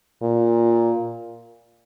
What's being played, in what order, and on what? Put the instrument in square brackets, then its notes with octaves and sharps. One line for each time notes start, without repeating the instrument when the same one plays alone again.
[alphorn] A#2